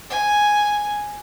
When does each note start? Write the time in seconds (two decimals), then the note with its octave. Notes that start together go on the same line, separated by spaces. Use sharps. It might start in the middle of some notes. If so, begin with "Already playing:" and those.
0.10 G#5